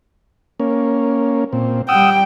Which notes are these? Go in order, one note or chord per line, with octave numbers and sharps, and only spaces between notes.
A#3 C#4
A#2 C4
G3 F#5 G5 D#6 E6